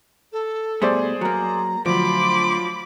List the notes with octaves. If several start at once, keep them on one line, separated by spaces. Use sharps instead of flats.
A4
B2 G3 A3 G#4 C5 D5
F#3 A#3 A#5
D2 F3 F#3 B5 C6 D6